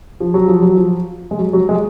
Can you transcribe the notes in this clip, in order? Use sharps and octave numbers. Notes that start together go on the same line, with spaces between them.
F3
F#3
F3
F#3
F3
G#3
F#3
F#3
G#3